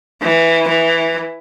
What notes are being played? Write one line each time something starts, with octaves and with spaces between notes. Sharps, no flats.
E3
E3